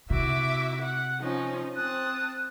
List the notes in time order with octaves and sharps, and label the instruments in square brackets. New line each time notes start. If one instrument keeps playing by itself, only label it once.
[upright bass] C3 [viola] E4 F#4 [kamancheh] E5 D6
[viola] F#5
[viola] F3 C#4 [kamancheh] D#4
[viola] C4 [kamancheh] A5 D#6 [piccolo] F#6